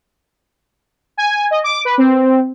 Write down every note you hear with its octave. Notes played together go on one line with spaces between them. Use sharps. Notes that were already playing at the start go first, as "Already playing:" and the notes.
G#5
D#5
D6
B4
C4